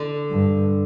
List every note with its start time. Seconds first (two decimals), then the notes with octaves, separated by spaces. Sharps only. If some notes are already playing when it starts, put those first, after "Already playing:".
Already playing: D3
0.31 G2